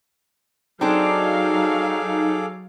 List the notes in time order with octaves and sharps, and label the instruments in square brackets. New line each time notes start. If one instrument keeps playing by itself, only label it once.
[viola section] F#3 F5 [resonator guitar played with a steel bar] C4 D4 [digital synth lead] D#4 [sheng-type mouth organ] G#4 A4 D6